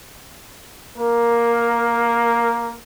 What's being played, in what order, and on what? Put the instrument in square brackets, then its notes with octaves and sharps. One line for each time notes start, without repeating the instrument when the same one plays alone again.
[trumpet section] A#3 A#4